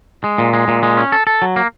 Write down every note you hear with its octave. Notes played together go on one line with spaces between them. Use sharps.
G#3
A#2
G#3
A#2
G#3
C#4
A4
A4
F#3
A#3